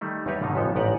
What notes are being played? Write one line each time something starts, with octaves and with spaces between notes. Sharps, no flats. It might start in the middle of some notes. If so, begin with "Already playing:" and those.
D#3 G3 A3 D#4
E2 G3 D#4 G4 B4 C#5
G#2 B2 D3 D#3 D#4
A1 F2 F3 B3 A4
A1 G#2 G4 D5 D#5 F#5